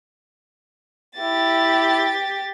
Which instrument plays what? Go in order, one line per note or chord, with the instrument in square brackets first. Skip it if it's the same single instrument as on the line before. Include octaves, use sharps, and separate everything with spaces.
[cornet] E4 [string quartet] G4 A6